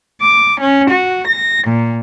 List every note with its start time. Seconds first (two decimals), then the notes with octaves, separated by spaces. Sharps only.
0.22 D6
0.61 C#4
0.90 F#4
1.28 A#6
1.68 A#2